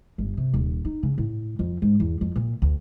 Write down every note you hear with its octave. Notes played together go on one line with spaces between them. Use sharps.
G1
C3
D#1
D#4
C#3
A2
F2
G#2
E2
F2
A#2
D2